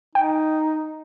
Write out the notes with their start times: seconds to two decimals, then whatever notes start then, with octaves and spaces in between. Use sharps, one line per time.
0.15 D#4 G5